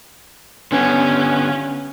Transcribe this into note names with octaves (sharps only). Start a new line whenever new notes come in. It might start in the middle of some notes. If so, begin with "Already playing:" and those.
D3 B3 C#4